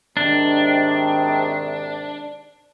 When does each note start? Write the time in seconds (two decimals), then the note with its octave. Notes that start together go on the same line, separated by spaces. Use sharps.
0.17 G#2 C3 D#3 D4